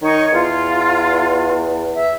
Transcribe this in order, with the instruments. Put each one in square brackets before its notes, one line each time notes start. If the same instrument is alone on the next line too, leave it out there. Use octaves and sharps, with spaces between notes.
[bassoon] D#3 [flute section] D#4 C#5
[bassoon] E2 [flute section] F4
[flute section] E5